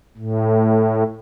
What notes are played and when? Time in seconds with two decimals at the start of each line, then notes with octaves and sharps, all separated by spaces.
0.17 A2